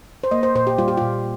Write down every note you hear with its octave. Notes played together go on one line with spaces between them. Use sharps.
C5
A#3 D#5
C5
A#2 C5
G4
G3 F4
G4
A#2 F4